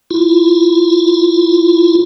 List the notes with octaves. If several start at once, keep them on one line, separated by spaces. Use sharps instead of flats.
E4 F4